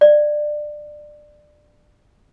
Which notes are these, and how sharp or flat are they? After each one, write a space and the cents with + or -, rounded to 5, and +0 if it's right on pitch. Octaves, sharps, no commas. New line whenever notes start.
D5 +20